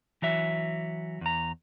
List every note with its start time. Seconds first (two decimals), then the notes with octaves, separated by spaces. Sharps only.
0.22 E3 F#3 E5
1.21 E2 A#5